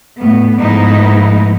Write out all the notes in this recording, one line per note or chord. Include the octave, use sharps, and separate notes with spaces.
A2 B3
G#2 F3 A3 B3 D#4 E4